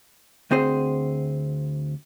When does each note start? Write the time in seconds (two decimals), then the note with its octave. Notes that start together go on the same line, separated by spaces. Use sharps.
0.51 D2 C4 G#4 C5